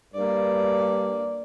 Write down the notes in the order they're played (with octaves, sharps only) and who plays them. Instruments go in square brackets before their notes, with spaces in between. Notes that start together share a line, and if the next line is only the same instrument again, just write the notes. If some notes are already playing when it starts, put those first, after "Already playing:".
[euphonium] G2 [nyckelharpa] A#3 D5